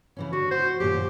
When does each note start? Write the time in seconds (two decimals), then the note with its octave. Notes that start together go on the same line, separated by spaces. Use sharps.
0.17 C#3 E3 C#4
0.33 D3 F#4
0.51 F#4 C5
0.80 F#2 A#2 D#3 G4